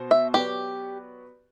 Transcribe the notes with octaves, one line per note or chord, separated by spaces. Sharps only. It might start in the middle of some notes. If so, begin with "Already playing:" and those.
Already playing: B2 F#4 C5
E5
F#3 B3 F#4 G4 B4 D5